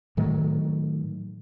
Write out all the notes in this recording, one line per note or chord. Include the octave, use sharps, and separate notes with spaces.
A2 D#3 F#3 A3